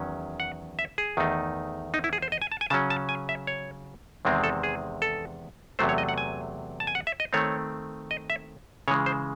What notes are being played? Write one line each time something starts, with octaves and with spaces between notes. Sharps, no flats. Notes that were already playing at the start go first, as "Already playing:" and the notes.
Already playing: E2 D#3 F#3 C#4
F#5
E5
G#4
E2 D#3 A3 D#4
D#4
E4
G#4
C5
D#5
G#5
A5
G#5
C#3 F#3 C#4 A5
A5
G#5
E5
C#5
E2 C3 D#3 G#3 C4
A4
G#4
A4
E2 C3 F#3 A3 C5
C#5
D#5
F#5
G#5
A5
G#5
F#5
E5
D#5
D#3 A3 C4 C#5
D#5
E5
C#3 E3 G#3 C#5
C5